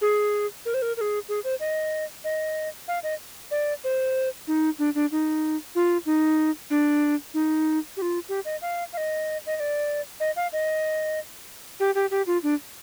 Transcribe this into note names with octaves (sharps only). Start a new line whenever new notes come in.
G#4
A#4
C5
A#4
A#4
G#4
G#4
C5
D#5
D#5
F5
D#5
D5
C5
D#4
D4
D4
D#4
F4
D#4
D4
D#4
G4
F4
G4
D#5
F5
F5
D#5
D#5
D#5
D5
D#5
F5
D#5
G4
G4
G4
F4
D4